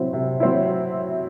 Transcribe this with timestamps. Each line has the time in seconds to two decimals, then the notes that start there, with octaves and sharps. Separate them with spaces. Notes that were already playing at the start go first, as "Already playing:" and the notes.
Already playing: C3 F#3 C4 E4
0.13 C3
0.40 F#3 C4 E4